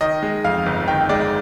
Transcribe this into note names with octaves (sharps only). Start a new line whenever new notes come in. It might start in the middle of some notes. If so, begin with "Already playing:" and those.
D#3 D#5
G#3
F2 F5
G1
D#3 G5
G#3 D5